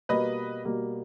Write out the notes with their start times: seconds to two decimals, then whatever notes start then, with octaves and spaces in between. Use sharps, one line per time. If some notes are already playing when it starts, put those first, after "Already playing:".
0.09 B2 G3 A#3 B4 D#5
0.65 B2 G3 A#3